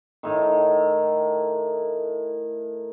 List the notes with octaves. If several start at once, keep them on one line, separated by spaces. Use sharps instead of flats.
A2 D#3